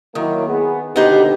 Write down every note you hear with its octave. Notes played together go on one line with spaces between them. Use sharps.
D#3 F#3 A#3 E4
B3 G#4
D#2 B2 D3 B3 D#4 G4 C5